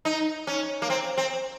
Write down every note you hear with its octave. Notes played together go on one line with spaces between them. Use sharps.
D#4
C#4
A#3
C4
C4